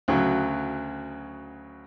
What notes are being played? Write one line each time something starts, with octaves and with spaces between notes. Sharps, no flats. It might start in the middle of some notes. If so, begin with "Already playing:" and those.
D2 C#3 F#3 C#6